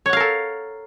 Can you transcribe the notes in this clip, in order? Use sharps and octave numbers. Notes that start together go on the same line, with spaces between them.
A4 A#4 C#5 F5 F#5